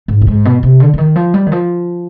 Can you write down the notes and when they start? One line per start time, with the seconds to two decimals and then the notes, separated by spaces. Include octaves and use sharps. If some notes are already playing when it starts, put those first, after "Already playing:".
0.08 G#2
0.21 B2
0.27 G#2
0.45 B2
0.63 C3
0.80 D3
0.94 D3
0.98 D#3
1.16 F3
1.34 G3
1.47 D#3
1.52 F3